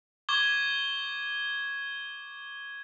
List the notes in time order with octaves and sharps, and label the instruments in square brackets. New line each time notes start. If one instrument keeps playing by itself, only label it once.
[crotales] C#6 D6 G#6 G7